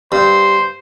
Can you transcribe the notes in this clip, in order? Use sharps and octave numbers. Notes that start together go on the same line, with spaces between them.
G2 C5